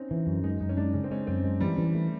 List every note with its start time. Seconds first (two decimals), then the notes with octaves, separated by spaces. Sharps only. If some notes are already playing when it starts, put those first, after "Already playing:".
Already playing: C4 C#4 D#4
0.11 E3
0.27 F#2
0.44 G#3 D#4
0.60 F#2 D#4
0.69 C#4
0.77 G#3 D4
0.94 C#3 C#4
1.04 C4
1.11 G#3 C#4
1.27 F#2 C4
1.44 G#3
1.60 E3 G3
1.78 E3
1.94 A3